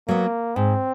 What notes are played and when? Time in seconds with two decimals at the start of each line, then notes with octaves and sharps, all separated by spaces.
0.08 F#3 A#3 B3
0.56 G#2 C4